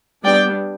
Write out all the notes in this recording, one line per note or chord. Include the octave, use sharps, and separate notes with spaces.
G3 B3 D4 D5 G5